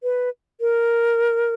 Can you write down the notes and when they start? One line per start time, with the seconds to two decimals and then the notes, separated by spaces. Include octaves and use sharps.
0.03 B4
0.61 A#4